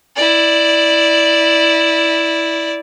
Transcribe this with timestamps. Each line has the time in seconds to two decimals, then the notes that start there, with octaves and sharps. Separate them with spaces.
0.16 E4 D5